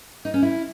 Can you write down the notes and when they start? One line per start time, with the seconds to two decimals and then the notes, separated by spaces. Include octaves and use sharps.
0.25 D#4
0.34 C#4
0.42 E4